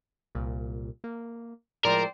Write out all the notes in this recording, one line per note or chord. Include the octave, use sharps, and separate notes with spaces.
C2 A#2
A#3
A2 F3 G#3 C4 A#4 C5 D5